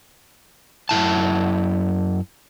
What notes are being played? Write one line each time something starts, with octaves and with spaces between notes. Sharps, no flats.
F#2 C#3 E4 A5